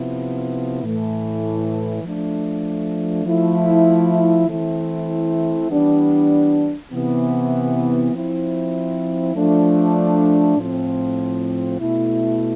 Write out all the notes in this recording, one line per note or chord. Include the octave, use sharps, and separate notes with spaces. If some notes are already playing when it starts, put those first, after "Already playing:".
Already playing: C3 F3 B3 E4
A2 E3 A3
F3 A3 D4
F3 A3 E4
E3 A3 C4 E4
E3 G3 B3 D4
C3 E3 B3
F3 C4 E4
F3 A3 D4
A2 F3 C4
B2 A3 E4